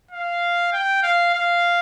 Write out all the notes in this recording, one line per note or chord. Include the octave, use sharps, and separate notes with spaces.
F5
G5
F5
F5